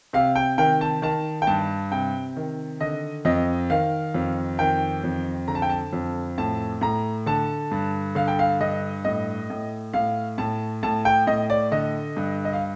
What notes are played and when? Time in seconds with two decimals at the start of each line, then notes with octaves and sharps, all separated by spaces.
0.13 C3 F5
0.35 G5
0.58 D#3 G5
0.81 A5
1.02 D#3 A5
1.42 G5
1.47 G2 A5
1.91 C3 G5
2.36 D#3
2.81 D3 D#5
3.25 F2 D#5
3.70 D#3 F5
4.14 F2
4.59 D#3 G5
5.04 F2
5.48 D3 A#5
5.55 A5
5.62 G5
5.70 A5
5.93 F2
6.38 A2 A5
6.81 A2 A#5
7.26 D3 A5
7.71 G2
8.15 D3 F5
8.28 G5
8.39 F5
8.60 G2 D#5
9.05 A2 D#5
9.50 A2
9.93 A2 F5
10.38 A2 A5
10.83 A2 A5
11.05 G5
11.27 A2 D#5
11.50 D5
11.71 D3 D#5
12.17 G2
12.45 D#5
12.53 F5